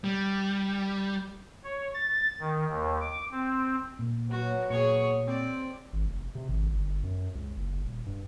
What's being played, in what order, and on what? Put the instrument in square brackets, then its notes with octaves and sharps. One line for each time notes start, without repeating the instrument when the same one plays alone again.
[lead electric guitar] G3
[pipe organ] C#5
A6
D#3
D#2
D6
C4
[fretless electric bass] A#2
[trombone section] F#3 B3 [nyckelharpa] F#4
[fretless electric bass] A#2 [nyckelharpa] G#4 C#5 [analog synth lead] C#6
[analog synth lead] C4 [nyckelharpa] D5
[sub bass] G#1
F1
C3
G#1
G1
F#2
C#2
F#1
D#1
G2